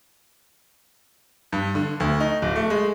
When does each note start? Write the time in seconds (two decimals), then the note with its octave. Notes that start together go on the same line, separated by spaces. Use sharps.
1.52 G2
1.75 D3
2.00 D2
2.20 D#4
2.42 D1
2.55 A3
2.70 G#3